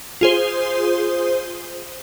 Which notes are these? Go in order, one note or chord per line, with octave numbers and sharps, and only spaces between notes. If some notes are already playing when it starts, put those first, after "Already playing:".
F4 G#4 C5